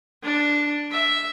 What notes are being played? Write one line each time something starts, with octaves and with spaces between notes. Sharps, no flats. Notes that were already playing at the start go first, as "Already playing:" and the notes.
D4
E5